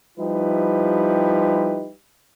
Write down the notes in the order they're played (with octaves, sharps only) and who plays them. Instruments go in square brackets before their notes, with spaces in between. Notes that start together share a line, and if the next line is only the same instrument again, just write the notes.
[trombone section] F3 G3 D#4 E4 G4 B4